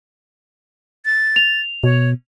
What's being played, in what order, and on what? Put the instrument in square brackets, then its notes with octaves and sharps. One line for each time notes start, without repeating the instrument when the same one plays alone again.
[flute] A6
[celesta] F7
[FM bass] B2 [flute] C#5